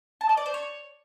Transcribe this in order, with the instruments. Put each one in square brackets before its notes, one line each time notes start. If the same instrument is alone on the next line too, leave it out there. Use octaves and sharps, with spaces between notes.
[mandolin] A5
D#5
D5
C5
C#5